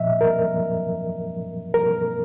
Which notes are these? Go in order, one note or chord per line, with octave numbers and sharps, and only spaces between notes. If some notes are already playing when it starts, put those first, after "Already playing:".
Already playing: A#2 F3 D#5 E5
A#4
A#4